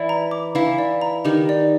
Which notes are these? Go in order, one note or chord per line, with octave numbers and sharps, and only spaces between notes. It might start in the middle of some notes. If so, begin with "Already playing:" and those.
Already playing: E3 E4 D5
A#5
D6
E3 E4 F5
D5
A#5
D#3 D#4 G4
D5